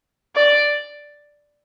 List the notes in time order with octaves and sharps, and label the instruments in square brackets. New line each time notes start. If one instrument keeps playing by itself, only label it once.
[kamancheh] D5